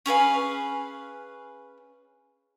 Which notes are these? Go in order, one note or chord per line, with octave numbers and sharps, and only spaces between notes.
C#4 G#4 B4 F5